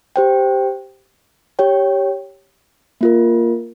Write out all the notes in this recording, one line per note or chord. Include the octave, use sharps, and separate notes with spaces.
G4 C5 G5
G4 C#5 G5
A#3 F4 A#4